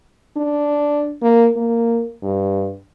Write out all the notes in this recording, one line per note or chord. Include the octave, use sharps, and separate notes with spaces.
D4
A#3
A#3
G2